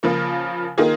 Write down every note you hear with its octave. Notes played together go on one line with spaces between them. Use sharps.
C#3 F3 A#3
D#3 A#3 F4 G#4